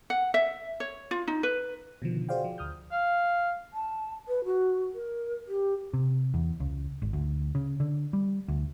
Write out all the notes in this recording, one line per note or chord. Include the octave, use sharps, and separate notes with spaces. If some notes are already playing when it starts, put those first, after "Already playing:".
F#5
E5
C#5
F4
D#4
B4
B2 D3 D#3 F3
F#4 G#4 C5 D5 F5 G5
F3
D2 D#6 F6 G6
F5
A5
B4
F#4
A#4
G4
C3
E2
C#2
G#1
D2
C#3
D3
G3
D2